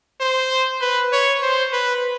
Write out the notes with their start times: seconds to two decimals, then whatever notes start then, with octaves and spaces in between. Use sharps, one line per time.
0.21 C5
0.82 B4
1.13 C#5
1.43 C5
1.73 B4